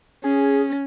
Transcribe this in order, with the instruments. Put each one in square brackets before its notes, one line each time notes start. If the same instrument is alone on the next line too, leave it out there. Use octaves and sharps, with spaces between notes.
[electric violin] C#4 [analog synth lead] G#4